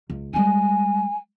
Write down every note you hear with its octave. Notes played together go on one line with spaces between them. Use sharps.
C#2
G3 G#3 G#5